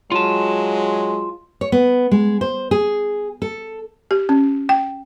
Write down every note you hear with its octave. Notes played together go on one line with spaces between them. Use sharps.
F#3 G#3 F4 A5
C#5
B3
G#3
C5
G#4
A4
G4
C#4
G5